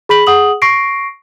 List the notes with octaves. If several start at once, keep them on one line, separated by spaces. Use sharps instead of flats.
G#4 B5 B6 F#7
G#4 F#5 D#6 F#7
C#6 A#6 C7 D7